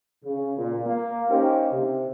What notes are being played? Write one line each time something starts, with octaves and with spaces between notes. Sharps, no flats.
C#3
A#2
A#3
A#3 C#4 D#4 G4 A#4 C5
C3